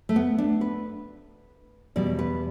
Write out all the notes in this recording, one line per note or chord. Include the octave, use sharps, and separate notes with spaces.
A3
B3
D4
B4
E2 B2 G3 D5
B4